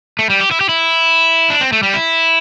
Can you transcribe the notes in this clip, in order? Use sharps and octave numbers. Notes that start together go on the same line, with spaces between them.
A3
G3
G4
E4
G4
E4
D4
C4
A3
G3
E4